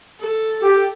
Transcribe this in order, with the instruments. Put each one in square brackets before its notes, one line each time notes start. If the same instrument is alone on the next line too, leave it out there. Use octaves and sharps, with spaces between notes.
[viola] A4
[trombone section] G4